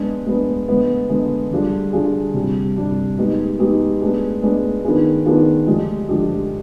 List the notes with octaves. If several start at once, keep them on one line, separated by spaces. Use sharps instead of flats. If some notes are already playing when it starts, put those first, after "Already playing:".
Already playing: G#3 B3 D4
G#3 B3 D4
D3 G#3 B3
D3 G#3 B3
D3 G3 D4 F4 G#4
D3 G3 D4 F4 G#4
C3 G3 D4
C3 G3 D4
G#3 B3 D#4 G4
G#3 B3 D#4 G4
G#3 B3 D4 G#4
G#3 B3 D4 G#4
D#3 B3 D4 F4 G#4
D#3 B3 D4 F4 G#4
D3 F3 G#3 D4 G4
D3 F3 G#3 D4 G4